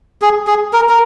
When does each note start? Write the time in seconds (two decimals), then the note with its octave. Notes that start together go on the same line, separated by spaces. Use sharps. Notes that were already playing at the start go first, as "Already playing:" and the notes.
0.22 G#4
0.47 G#4
0.73 A#4
0.89 A#4